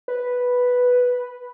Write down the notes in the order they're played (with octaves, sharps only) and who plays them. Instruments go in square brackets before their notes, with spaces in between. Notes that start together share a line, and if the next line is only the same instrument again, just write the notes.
[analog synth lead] B4